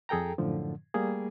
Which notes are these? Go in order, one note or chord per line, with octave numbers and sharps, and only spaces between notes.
F2 G#4 A4 G5 A#5
F#2 A2 D3 F3
G3 A3 A#3 G#4